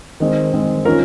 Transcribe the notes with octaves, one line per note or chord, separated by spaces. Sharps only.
D#3 G#3 C4
D#3 G#3 C4
D#3 A#3 C#4 F4 A#4